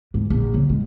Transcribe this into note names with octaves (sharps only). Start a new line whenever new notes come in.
G#2
A#1
C#3
G#3